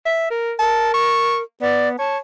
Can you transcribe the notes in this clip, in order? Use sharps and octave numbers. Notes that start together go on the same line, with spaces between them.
E5
A#4
A#4 A5
C#6
B3 D5
C#5 A5